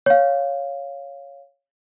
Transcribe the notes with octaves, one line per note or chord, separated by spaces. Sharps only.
C#5 F5